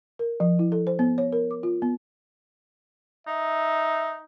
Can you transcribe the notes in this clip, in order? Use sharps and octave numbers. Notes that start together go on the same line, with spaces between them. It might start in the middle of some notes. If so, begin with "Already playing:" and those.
A#4
F3
E4
A4
C5
B3
C#5
A#4
D6
F4
B3
D#4 E5